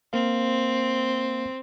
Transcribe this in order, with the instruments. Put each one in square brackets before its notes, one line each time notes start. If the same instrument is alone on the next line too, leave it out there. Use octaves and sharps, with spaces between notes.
[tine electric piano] A#3 A#4 F5 [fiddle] C4